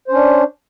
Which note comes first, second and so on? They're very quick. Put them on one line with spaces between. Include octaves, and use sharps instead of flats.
C5 C#4 D4